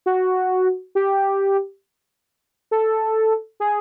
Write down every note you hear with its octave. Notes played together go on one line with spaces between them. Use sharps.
F#4
G4
A4
G#4